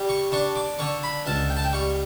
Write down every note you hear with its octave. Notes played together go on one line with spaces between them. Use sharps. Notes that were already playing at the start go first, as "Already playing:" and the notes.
Already playing: G3
C#6
D4 C#6
D6
D3 C#6
B5
C#2 A5
G5
A5
G5
G3 C#6